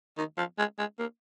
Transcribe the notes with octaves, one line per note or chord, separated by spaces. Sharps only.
D#3
F3
G#3
G#3
A#3